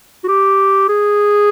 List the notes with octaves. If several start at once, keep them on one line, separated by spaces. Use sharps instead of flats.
F#4
G4
G#4